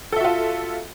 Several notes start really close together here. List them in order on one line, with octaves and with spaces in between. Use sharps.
A4 E5 F#4 F4